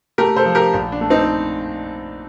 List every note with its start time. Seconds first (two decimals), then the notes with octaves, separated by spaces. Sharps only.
0.18 A3 G4 A#4
0.36 A4 C5
0.46 F3
0.55 G4 A#4
0.74 A#1
0.92 D4
1.01 A3
1.10 C4 D#4